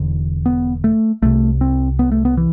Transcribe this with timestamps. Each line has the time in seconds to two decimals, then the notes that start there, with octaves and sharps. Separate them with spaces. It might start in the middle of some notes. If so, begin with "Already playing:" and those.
Already playing: E1 E2 D3
0.46 B3
0.84 A3
1.22 C2 C3 A3
1.61 C4
1.99 B3
2.12 A3
2.25 B3
2.37 E3